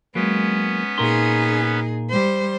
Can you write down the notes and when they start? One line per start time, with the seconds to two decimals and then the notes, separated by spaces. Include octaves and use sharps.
0.15 F#3 G#3 A#3 B3 C#4 B4
0.98 A#2 D#4 G#4 A#4 C6
2.10 G3 C5